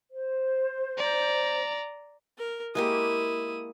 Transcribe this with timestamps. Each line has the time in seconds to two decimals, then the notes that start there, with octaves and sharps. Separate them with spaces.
0.11 C5
0.98 D5 A#5
2.38 A#4
2.75 G#3 A#3 E4 G4 D#6